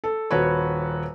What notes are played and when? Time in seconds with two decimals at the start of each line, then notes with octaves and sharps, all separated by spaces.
0.04 A4
0.31 D#1 F#4 B4 C#5